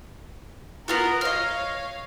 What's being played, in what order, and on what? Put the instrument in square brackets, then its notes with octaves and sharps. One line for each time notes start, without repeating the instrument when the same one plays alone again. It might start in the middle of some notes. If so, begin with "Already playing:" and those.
[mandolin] B3 F4 F#4 [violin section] A#4
[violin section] C#5 F5 [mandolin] D#5 F6